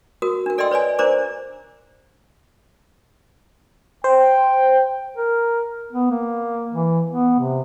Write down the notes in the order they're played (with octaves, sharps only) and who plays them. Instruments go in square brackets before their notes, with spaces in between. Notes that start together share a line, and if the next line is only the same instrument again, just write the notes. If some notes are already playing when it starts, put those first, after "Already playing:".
[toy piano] F#4 A#4 D#6
D4 A#4
A4 D5 D#5 G5 C6 E6
B4 C#5 D5 G#5
D4 A#4 C5 D5 A#5 D6
[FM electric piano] C5 [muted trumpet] G5
[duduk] A#4
B3
A#3
E3
B3
C3